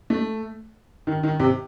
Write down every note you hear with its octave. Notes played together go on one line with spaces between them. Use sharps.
A3
D#3
D#3
C3